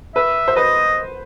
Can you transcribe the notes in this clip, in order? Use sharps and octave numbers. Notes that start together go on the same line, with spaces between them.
B4 E5
C5
B4 D#5